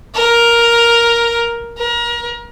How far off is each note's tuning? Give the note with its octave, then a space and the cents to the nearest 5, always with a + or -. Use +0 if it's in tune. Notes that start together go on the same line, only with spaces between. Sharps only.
A#4 +5
A#4 +30